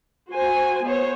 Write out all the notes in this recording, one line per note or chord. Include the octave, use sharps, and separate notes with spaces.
F#4 C5 G#5
B3 C5 C#5